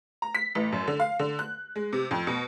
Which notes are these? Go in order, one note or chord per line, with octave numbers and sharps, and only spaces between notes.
A#5
B6
A1
F#2
D3
F5
D3
F#6
G#3
C3
F2
B2